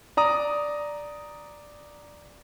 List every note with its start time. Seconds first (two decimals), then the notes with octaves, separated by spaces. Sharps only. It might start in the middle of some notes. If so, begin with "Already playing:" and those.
0.17 D5 A#5 D#6